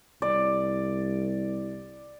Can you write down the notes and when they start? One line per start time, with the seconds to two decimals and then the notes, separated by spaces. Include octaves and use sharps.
0.22 C2 D5